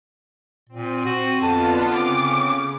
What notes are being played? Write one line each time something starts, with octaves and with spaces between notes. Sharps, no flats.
A#2 C4 D#7
F#4
F2 D3 B3 F4 A5
C#3 C4 D6